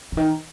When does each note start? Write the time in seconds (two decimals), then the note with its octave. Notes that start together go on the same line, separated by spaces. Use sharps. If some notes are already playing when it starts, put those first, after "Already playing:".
0.12 C#3
0.17 D#3